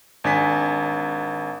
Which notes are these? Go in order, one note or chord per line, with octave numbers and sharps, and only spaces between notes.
G#1 D4 G#5 B6